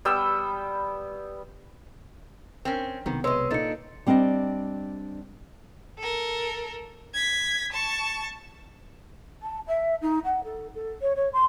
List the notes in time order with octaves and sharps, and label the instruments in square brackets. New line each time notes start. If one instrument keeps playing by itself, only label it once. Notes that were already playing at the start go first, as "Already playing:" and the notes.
[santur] G3 B3 G5 E6
[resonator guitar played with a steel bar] C4 C#4 [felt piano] A#4 G5
[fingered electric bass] B1 C3 B3 [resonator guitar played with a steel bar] D#3
[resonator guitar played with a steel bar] G#3 D#5 [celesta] B4 C6 E6 [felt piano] C#5
[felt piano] A#2 D#4 A4 [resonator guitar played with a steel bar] D4 [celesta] A6 C#7
[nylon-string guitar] G3 C4 D4 D5 D#5 G5
[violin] A4 A#4
G#6 B6
A5 C#6
[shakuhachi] A5
E5
D#4
F#5
A4
A4
C#5
C#5
C6